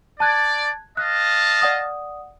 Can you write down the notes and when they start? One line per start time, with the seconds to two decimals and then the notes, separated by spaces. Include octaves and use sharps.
0.20 D5 A5 F#6 G#6
0.97 D#5 F5 A5 F#6
1.62 D5 F#5 D#6